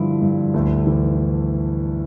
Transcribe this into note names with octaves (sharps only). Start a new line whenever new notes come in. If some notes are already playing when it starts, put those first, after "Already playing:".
Already playing: G2 D3 F3 E4
G2
D2 A3
E3